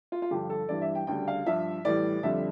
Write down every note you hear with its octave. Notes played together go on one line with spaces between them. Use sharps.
F4
F4
G2 D3 F3 G4
A4
G2 E3 G3 D5
E5
G5
D2 C#3 G3 G5
F5
G2 F3 E5
A2 E3 G3 D5
F2 D3 G3 E5